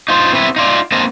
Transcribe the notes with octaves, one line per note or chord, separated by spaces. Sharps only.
D#4 F4 C5
B3 C4 E4 B4
D#4 F4 D5
A#3 C4 D4 A#4 C5 D#5